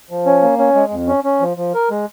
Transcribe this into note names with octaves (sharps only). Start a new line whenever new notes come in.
F3
C#4
A#3
C#4
G#3
F2
C#4
C#4
F3
F3
A#4
G#3